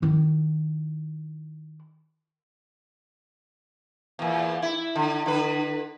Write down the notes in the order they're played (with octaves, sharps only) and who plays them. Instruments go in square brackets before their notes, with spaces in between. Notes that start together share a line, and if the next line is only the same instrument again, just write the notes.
[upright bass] D#3 E4
[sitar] E2 A#2
E4
D3
D3 B4